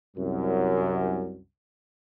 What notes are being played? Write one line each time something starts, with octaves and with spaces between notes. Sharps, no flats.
C2 F#2